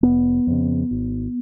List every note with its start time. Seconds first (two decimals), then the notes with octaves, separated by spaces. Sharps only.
0.03 F1 B3
0.47 F2 C#3
0.91 G#1